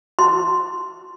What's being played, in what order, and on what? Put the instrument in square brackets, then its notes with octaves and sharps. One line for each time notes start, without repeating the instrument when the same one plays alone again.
[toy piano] C6